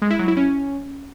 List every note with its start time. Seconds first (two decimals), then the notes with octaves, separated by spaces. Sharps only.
0.02 G#3
0.10 E4
0.19 F#3
0.28 E4
0.37 C#4